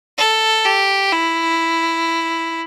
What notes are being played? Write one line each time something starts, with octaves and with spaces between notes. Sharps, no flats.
A4
G4
E4